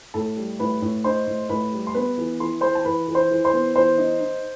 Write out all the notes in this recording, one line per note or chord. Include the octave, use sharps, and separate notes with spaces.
A2 A4 A5
G3
A2 B4 B5
A2
D#4 C5 C6
A2
A2 B4 B5
G3
C6
B3 B4 B5
E3
E3 C6
E3 C5 C6
A5
E3 B4 B5
E3
C5 C6
E3
C5 C6
B3
E3 C5 C6
D#4
D#4